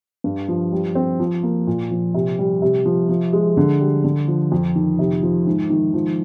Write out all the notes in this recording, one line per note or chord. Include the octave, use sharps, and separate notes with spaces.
G2
F3
G3
C4
F3
A#3
A#2
F3
C3
G3
C3
F3
F3
G#3
D3
G3
D3
F3
F2
D#3
C3
F3
G#2
D#3
F3